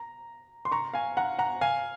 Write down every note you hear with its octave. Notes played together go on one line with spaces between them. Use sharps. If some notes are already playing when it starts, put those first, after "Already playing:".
Already playing: A#5
C6
A#5 C#6
F5 G#5
F#5 A#5
F#5 A#5
F5 G#5